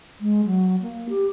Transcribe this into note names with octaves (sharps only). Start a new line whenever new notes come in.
G#3
F#3
A#3
G4